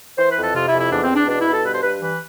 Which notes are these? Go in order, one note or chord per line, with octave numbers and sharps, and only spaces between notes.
E3 C5
B4
F2
A4
C3 F4
E4
F2
E4
E2 D4
C4
E2
D4
B2 D4
E4
B2
A4
G2 B4
C5
G2 B4
E3 B4